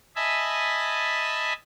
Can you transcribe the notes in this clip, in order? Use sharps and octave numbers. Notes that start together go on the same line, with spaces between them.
D#5 E5 G#5 A5 B5